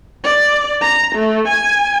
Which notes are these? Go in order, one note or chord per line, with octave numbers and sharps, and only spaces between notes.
D5
A#5
A3
G#5